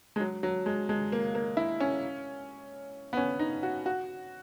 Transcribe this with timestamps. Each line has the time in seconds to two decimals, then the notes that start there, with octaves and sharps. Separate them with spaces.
0.16 G#3
0.20 F#3
0.43 F#3
0.66 G#3
0.89 G#3
1.12 A#3
1.35 A#3
1.57 E4
1.80 C#4
3.13 B3
3.17 C#4
3.39 D#4
3.63 F#4
3.86 F#4